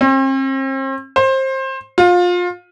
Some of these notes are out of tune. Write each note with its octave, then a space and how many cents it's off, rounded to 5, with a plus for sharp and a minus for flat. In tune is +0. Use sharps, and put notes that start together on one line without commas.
C4 +40
C5 +25
F4 +25